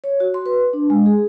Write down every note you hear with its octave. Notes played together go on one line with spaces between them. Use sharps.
C#5
F#4
C6
B4
D4
G#3
G#4